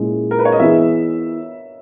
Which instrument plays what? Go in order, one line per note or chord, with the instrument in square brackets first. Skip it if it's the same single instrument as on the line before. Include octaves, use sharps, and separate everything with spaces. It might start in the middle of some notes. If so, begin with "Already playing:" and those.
Already playing: [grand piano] A#2 G#3 C#4 E4 G#4
[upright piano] A#4
B4
C#5
D#5
[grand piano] E3 B3 E4 G#4 [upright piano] E5